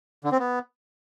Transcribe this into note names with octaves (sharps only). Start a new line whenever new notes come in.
D3
C4
B3